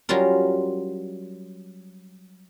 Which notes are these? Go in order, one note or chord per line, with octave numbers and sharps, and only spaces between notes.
F#3 G3 C#4 F4 A#4